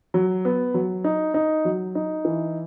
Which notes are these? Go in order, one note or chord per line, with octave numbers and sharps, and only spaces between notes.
F#3
B3
F#3
D#4
D#4
F#3
D#4
E3